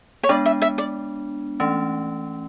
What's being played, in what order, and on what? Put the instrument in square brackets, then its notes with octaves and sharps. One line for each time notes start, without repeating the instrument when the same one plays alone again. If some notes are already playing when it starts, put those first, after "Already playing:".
[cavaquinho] C#5
[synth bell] G#3 B3 D4 [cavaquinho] D5
[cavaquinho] E5
E5
D5
[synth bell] E3 A3 C#4